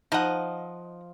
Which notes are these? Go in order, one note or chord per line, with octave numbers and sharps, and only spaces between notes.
F3 D#4 D#5 F#5